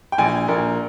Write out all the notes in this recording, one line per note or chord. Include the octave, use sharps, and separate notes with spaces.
G5
A#1 G#5
A#1 A#4